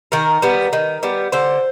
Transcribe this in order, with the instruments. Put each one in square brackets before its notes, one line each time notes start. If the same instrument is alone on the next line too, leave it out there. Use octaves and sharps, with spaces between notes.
[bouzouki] D#3 A#4
G3 B3
D#3
G3 B3
D3 C5